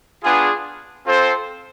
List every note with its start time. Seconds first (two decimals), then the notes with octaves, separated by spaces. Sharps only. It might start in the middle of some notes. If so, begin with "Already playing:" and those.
0.24 B3 D4 F4 G#4
1.05 C4 F4 A4 C5